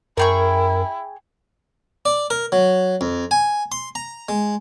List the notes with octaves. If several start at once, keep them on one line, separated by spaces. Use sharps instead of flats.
F#2 E4 G#4 A#4 G5 C#6
D5
A#4
F#3
F2
G#5
C6
A#5
G#3